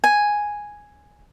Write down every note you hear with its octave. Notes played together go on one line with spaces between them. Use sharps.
G#5